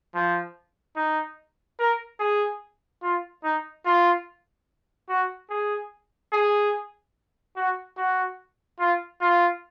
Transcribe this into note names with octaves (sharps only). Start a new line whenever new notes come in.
F3
D#4
A#4
G#4
F4
D#4
F4
F#4
G#4
G#4
F#4
F#4
F4
F4